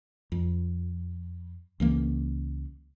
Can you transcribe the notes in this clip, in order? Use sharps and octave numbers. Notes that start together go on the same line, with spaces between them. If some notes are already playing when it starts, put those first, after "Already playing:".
F2
C#2 E3 A#3